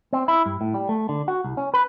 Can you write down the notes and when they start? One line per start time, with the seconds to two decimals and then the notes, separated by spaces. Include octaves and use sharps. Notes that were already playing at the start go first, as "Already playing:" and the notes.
0.13 C4
0.28 E4
0.46 G2
0.61 A2
0.74 G3
0.89 A3
1.09 D3
1.28 F#4
1.44 C2
1.57 C#4
1.74 B4